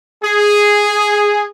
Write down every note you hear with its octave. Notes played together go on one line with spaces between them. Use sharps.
G#4